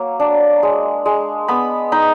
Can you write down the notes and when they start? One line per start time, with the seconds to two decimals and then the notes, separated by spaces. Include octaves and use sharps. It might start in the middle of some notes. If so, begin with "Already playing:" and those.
Already playing: F#3 A#3
0.20 D4
0.63 G#3
1.06 G#3
1.48 B3 B5
1.92 D#4 B5